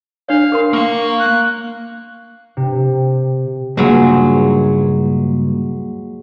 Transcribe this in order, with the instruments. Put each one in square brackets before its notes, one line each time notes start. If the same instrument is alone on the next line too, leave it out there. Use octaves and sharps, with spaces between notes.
[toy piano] D4 C#5 [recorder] F5
[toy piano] G#4 A#4 C6
[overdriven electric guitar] A#3 F5 [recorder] C#6
[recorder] F#6
[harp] C3
[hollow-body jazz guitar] C#2 G2 A#2 [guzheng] F#3 G#3